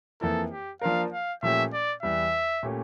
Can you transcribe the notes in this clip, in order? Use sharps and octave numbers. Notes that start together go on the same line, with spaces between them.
F2 E3 A#3 E4 A4
G4
F3 A#3 D4 F4 A#4 F5
F5
A#2 F3 A3 C#4 G4 E5
D5
E2 E3 G3 E5
A#2 A3 C#4 G4